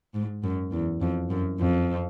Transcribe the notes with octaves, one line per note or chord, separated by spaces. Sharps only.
G#2
F#2
E2
F2
F#2
F2